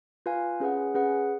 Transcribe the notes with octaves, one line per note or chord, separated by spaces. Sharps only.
F4 B4 F5 G#5
C#4 G#4 B4 F#5
C#4 G#4 B4 F#5